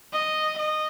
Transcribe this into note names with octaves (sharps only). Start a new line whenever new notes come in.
D#5
D#5